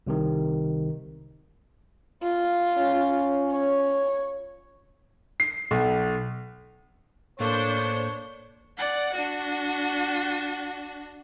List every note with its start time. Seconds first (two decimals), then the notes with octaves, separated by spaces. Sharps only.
0.07 C2 C3 D#3
2.23 F4
2.78 C#4
3.52 C#5
5.40 C7
5.71 B1
7.40 A2 A#3 D4 A4 C5 C#5 G6
8.78 D5 F#5
9.15 D4 F#4